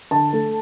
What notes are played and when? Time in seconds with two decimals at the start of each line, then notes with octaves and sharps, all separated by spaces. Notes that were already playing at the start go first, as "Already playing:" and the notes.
0.11 D3 A5
0.33 A3